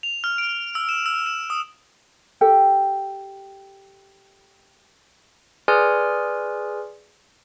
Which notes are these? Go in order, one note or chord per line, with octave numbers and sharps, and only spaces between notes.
F7
F6
D7
E6
E7
E6
E7
D#6
G4 A4 G5
G#4 B4 D5 G#5 C6 F6